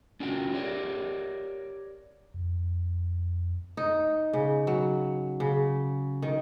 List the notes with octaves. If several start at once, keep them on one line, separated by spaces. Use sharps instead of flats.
C#4 D4 F4 F#4 A#4 G5
G4 A#4 C#5 D5
F2
D#4
C#3
F#3
C#3
D#3